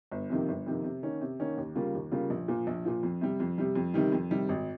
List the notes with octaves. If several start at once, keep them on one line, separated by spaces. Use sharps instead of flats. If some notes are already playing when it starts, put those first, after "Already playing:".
G1
F2 C3 D#3 A#3
G1
F2 C3 D#3 A#3
C3
D#3 A#3 C#4
C3
D#3 A#3 C#4
D#2
C#3 G3 A#3 F4
D#2
C#3 G3 A#3 F4
A#1
A#2 F3
A#1
A#2 F3
F2
C3 G3
F2
C3 G3
F2
C3 D#3 G3
F2
C3 D#3 G3
G#1